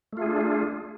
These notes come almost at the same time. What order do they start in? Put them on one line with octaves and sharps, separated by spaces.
A3 F4 G#4 D4